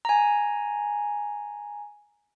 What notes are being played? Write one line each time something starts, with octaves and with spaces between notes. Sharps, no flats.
G#5 A#5